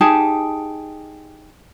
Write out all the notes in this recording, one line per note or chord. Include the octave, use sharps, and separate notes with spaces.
D#4 G4 G#4 A5